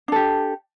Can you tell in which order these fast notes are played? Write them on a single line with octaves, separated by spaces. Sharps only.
D4 A4 G4